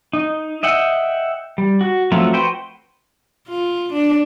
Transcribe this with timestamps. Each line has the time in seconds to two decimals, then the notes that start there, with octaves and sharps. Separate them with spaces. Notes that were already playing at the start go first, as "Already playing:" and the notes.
0.13 D#4
0.63 D#5 E5 F#5 G5
1.58 G3
1.81 F#4
2.12 F3 F#3 A3 C4 F4
2.33 F#4 B4 C5 G5
3.48 F4
3.93 D4